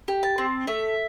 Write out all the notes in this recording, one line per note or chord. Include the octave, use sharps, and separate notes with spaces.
G4
A5
C4
A3 E5